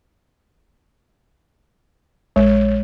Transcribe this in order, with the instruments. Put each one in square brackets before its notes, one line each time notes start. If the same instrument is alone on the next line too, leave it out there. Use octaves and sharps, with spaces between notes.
[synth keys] A#1 C#5 [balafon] G#3